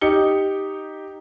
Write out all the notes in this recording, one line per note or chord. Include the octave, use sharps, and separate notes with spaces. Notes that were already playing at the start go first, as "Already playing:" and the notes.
D#4 G4 C#7 G7